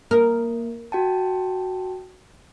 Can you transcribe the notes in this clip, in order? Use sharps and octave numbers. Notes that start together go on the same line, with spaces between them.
A#3 A#4
F#4 G5 A5